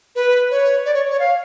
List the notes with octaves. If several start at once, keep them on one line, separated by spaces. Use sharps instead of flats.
B4
C#5
D5
C#5
C#5
F5